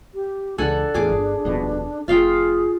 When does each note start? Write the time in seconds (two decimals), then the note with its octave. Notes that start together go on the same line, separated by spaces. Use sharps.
0.14 G4
0.58 C#2 C#3 E3 D4 A4 F#5 G#5
0.94 E2 A2 G#4 D6
1.10 G1
1.45 D#1 F2 B2
2.08 F1 F4 G#4 F5 G5